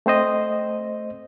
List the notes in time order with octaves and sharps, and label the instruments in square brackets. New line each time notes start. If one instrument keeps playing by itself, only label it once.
[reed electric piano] A3 C4 C5 D#5